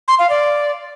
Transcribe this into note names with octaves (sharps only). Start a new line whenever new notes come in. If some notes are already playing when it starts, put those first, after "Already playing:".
C6
F5
D5